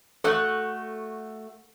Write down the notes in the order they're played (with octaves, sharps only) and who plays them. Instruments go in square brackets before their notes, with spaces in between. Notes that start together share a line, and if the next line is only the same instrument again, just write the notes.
[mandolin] A3 F#4 F#6 [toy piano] A4